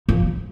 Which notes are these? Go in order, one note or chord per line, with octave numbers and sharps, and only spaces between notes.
F3